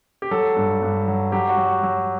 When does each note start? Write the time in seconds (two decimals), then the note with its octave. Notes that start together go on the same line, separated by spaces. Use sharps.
0.22 G4
0.31 F#3 A4
0.56 G2
0.82 G2
1.08 F#3
1.32 F#3 G4
1.49 F#4
1.58 F#3
1.66 F#4
1.83 F#3